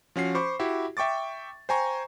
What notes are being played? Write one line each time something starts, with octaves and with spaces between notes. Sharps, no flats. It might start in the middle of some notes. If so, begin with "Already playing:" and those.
F3 C#4 F#4 C7
C5 B5 C#6 D6
E4 F#4 G4 E5
E5 G5 C#6 D6 A6
C5 G5 G#5 A#5 C#6